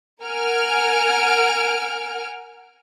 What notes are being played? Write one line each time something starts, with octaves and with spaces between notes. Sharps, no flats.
A#4 F#5 G#5 F6 D7